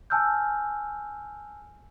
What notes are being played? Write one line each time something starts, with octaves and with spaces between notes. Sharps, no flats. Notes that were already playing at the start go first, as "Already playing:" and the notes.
G#5 A5 E6 F6 G6